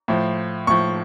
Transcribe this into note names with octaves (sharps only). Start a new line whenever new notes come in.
A2 F3
A2 F3 C#6